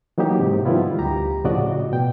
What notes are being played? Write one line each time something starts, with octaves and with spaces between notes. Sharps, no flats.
E3 F#3 A#3 D#4 G4
G#2 C3
D#3 F3 G3 B3 E4 F4
D2 G4 A#5
A2 C#3 F3 F#4 D5 D#5
B2 G5